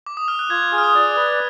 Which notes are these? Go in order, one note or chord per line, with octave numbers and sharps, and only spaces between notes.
D6
D#6
F6
F#6
F4 G#6
G#4
F6
D#6
D5
B4